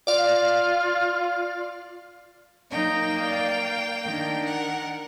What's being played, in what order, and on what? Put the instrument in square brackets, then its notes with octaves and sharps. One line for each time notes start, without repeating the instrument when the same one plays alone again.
[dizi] F4 [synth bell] D5 F5
[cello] F#3 D#4 [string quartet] A#3 G5
[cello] D5 F5
D#3 D4
[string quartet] A#4 F#5